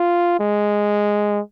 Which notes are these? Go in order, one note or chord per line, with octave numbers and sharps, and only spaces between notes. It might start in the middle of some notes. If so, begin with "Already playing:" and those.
Already playing: F4
G#3